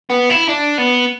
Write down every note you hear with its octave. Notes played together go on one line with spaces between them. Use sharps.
B3
E4
D4
B3